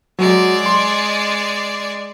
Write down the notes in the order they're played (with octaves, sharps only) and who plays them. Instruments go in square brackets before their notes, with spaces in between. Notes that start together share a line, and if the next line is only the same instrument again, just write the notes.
[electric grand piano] F#3 [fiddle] G#3 D5
[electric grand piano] C6